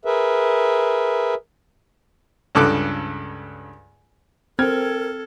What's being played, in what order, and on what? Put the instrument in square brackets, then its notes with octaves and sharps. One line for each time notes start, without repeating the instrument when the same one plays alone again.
[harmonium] G#4 A#4 B4 E5
[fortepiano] C#2 G2 A4 D6 F#6
[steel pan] C4 [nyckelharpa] A4 [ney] A#4 [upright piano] G5 F6 G#6